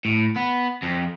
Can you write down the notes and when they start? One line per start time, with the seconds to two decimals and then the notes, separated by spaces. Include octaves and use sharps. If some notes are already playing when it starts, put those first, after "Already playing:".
0.05 A2
0.36 B3
0.82 F2